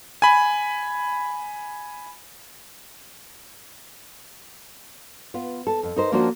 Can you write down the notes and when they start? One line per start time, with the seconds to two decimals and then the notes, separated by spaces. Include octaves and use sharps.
0.22 G#5 B5
5.34 B3 F4
5.67 A4
5.83 F2
5.96 D#4 A#4 C5
6.12 F3 A#3 C#4 D4 F#4 C5